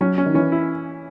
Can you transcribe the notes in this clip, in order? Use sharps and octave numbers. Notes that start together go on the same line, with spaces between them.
F#3 C#4
C#4
D#3
E3 C#4
E4